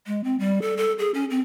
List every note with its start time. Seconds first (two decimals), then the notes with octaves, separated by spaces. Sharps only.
0.07 G#3
0.24 C4
0.39 G3
0.62 A4
0.77 A4
0.99 G#4
1.14 C#4
1.30 C4